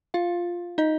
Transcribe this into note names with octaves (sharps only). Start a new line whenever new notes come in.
F4 F5
D#4 D#5